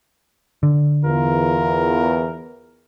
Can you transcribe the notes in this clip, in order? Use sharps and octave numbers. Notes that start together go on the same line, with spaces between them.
D3
E2 F4 A#4